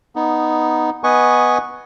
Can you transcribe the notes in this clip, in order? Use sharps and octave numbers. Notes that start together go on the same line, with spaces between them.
B3 D#4
B3 B4 D#5 G#5 C#6